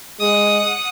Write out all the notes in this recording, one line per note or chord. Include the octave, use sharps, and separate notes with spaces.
G#3 F#5 D#6